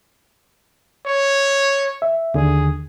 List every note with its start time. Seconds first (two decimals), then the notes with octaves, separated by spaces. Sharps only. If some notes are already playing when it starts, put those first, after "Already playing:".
1.06 C#5
2.02 E5
2.34 D#2 D3 G#4